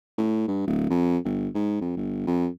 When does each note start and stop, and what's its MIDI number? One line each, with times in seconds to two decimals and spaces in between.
0.18 0.45 45
0.48 0.66 43
0.67 0.89 26
0.90 1.18 41
1.25 1.48 31
1.54 1.78 44
1.81 1.96 41
1.97 2.24 31
2.27 2.48 41